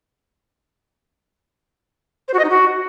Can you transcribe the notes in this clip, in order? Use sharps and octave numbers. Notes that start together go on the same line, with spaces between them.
C5
F#4
D#5
D#4
F#4